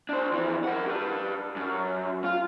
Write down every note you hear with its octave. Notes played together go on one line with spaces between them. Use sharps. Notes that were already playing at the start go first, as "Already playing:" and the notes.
D4 C5
F2 E3
A#4 F#5
G4 B4
F#2
F4